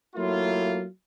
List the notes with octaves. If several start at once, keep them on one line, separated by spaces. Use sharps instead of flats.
F#3 A3 A#3 E4 F4